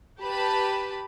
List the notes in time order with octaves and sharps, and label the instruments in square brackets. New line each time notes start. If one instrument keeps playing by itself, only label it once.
[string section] G4 B4 A5 B5